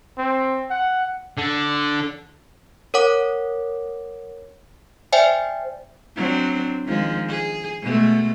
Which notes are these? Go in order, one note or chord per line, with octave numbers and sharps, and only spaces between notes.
C4
F#5
D3
A#4 C#5 F#5 D6
C5 D5 E5 G5 G#5
F#3 C4 D4
D#3 F3 G#3
G#4
B2 G#3 A3